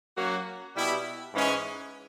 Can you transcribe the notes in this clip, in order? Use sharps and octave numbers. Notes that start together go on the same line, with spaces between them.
F#3 A#3 C#4 F#4
B2 G3 B3 E4 G4
G#2 E3 G#3 C#4